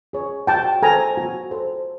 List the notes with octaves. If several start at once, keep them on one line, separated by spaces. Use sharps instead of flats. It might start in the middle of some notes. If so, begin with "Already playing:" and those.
G#4 C#5
F#4 G5 A5
A4 C5 G#5 A#5
F#4
A4 C5